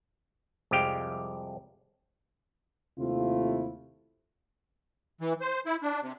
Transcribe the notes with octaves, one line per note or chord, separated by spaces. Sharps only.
C2 F2 G#3 G4 F5 G5
D#2 C3 A3 C4 E4 F4
E3
C5
E4
D4
C3